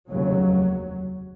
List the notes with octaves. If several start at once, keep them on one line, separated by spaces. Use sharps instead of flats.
F1 D#2 C#3 F#3